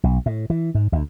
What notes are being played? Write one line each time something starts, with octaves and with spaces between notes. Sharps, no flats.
B1
A2
E3
G#2
D2